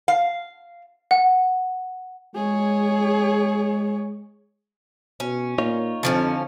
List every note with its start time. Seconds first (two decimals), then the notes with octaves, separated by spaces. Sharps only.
0.08 F5
1.11 F#5
2.36 G#3 G#4 C#5
5.20 B2 C#4
5.58 A#2 D#4 F4 C#5
6.03 F2 D3 F3 C#4